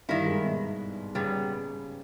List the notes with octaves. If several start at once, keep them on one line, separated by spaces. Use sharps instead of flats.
G2 D#3 G3 A#3 E4
G#2 G#3
B2
A#2 C#3 G3 B3